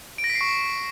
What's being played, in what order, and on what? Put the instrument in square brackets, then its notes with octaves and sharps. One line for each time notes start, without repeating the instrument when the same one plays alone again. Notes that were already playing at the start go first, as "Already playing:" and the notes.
[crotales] D7
A#6
B6
C7
C#6